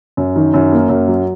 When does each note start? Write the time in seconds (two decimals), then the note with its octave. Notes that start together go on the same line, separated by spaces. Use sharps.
0.17 F#2
0.36 D#3
0.54 F#2
0.72 A#3
0.89 F#2
1.08 F#3